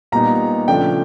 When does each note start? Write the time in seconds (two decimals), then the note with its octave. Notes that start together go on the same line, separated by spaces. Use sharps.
0.12 A#2 G3 B3 D#4 A#5
0.68 C#3 F3 A3 D4 G5